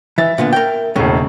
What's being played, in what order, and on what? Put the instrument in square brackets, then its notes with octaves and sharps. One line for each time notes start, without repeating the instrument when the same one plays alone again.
[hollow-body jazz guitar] E3 [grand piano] E5 A6
[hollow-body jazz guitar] A#2 D3 B3
A#4 G5
[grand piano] E1 A2 [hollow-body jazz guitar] D#2 C#3 G#3